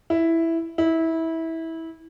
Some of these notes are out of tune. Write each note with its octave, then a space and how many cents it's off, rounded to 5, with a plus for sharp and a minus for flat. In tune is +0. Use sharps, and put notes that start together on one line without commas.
E4 +0
E4 -20